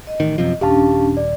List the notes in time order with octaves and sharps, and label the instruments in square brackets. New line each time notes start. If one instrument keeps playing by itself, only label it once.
[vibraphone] D#5
[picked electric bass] A1 D#3
F#2 C3 F3
[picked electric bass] D#1 [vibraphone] C#4 D4 [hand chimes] G4 F5 A5
[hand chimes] D5